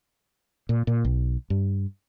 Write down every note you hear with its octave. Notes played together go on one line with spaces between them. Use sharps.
A#2
A#2
B1
G2